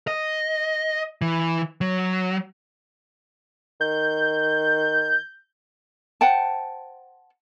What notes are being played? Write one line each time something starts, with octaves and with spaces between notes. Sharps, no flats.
D#5
E3
F#3
D#3 G6
C5 F#5 G5 A5